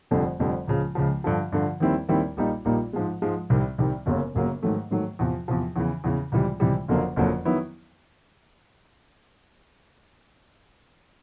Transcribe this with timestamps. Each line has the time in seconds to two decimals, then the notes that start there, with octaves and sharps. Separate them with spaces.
0.11 F1 F2 D3 G3
0.40 F1 F2 D3 G3
0.68 C#2 C#3 F3
0.95 C#2 C#3 F3
1.24 G2 D3 F3
1.52 G2 D3 F3
1.80 D#2 D#3 G3 C4 E4
2.09 D#2 D#3 G3 C4 E4
2.37 A#1 A#2 G3 A#3 D#4
2.65 A#1 A#2 G3 A#3 D#4
2.93 G#2 F3 G#3
3.22 G#2 F3 G#3
3.50 C2 C3 D#3 G3
3.78 C2 C3 D#3 G3
4.06 G1 F#2 C#3 F#3 A#3
4.35 G1 F#2 C#3 F#3 A#3
4.63 G#2 D#3 F#3 A3
4.91 G#2 D#3 F#3 A3
5.19 E2 C3 F3
5.48 E2 C3 F3
5.76 E2 C#3 E3
6.04 E2 C#3 E3
6.32 C#2 C3 E3 G3
6.60 C#2 C3 E3 G3
6.88 F#1 F2 D3 F#3 A#3
7.16 F#1 F2 D3 F#3 A#3
7.45 D#3 F#3 B3 E4